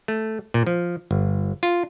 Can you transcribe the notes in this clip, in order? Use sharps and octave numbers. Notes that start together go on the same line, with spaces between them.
A3
A#2
F3
G1
F4